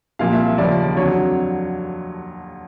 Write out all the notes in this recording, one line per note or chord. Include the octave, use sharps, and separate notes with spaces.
C2 A#2 F3 F5
E5
D#2 C#3 F3 D5
F2 D3 F#3 C#5